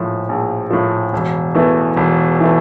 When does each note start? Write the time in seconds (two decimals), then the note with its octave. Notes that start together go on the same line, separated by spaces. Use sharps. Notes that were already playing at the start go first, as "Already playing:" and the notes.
Already playing: A#1 A2 F3
0.29 A#1
0.71 A2 F3
1.13 E1
1.55 E2 E3 A3
1.97 E1
2.41 E3 A3